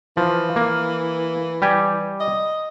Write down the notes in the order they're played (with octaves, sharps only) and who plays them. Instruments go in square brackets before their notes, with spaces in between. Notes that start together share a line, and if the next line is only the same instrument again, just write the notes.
[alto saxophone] E3 [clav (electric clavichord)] F3
[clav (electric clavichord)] A#3
G3 G4 G#5
[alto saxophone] D#5